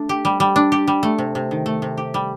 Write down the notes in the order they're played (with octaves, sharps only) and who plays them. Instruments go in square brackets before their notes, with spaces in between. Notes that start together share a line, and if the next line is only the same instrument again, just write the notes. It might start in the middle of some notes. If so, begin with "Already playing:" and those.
Already playing: [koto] A3 D4
G4
G3
G3
D4
G4
G3
A3
C3
C3
D#3
A3
C3
G4
G3